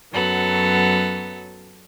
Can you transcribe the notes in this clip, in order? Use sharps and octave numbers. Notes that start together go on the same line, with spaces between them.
F#2 F#3 B3 A4